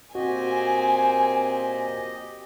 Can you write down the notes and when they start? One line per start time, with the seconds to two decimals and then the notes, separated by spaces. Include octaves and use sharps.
0.15 A#2 C4 F#4 G4 D#5 G#5